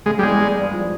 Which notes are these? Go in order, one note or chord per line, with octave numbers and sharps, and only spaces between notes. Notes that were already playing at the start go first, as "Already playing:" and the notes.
C#3 G#3
G3
E2 G#3
G3
G2
F3